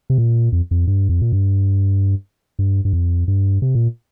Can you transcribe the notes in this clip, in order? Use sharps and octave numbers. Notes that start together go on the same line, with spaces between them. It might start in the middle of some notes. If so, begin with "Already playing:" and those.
C3
A#2
F2
F2
G2
F2
A#2
G2
G2
G2
F2
G2
C3
A#2